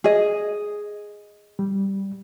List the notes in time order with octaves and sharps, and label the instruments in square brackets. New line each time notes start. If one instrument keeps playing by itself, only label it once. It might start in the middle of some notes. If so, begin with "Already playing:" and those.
[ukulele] G#4 D#5
[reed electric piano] G3